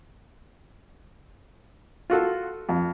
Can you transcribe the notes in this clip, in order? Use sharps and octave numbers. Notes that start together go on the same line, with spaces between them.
F4 F#4 A4
F2